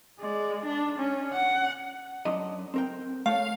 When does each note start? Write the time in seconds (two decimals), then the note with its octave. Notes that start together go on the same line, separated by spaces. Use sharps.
0.19 G#3 D5
0.65 D4 D5
0.98 C#4
1.33 F#5
2.25 F#2 D4 D#5
2.74 C4 A#4 G5
3.26 A3 C#5 F5